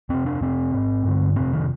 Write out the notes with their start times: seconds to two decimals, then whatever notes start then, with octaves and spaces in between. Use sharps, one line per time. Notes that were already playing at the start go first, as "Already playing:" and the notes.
0.09 F2 C3 C4
0.26 D4
0.41 F2 C3 C4
0.74 G#2
1.05 G2 D3
1.36 F2 C3 C4
1.53 D#3